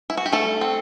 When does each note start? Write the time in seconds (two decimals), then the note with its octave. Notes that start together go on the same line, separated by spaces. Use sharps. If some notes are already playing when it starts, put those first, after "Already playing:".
0.10 E4
0.17 F#4
0.26 G4
0.32 G3 A3 A4
0.61 C4